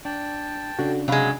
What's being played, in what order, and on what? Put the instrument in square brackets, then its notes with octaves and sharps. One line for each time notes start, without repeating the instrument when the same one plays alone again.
[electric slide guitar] D4 [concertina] G5 A5
[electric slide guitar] C#3 D4 [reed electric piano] F#4 A4
[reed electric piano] C3 F5 B5 [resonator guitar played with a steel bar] F#3 G#3